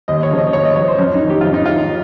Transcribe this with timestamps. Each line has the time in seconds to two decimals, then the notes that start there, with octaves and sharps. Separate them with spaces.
0.08 D#2 D#5
0.23 C#5
0.31 C#3 F3
0.38 D#5
0.53 D#2 C#5
0.65 D#5
0.76 C#3 F3 C#5
0.88 C5
0.98 F2 C#4
1.14 D#4
1.22 D#3
1.30 G4
1.41 F2 F4
1.54 D#4
1.66 D#3 F4